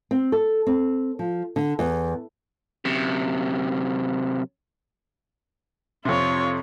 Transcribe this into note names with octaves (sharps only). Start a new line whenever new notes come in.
C4
A4
C4
F3
D3
E2
F#2 C3
F2 C3 F4 C#5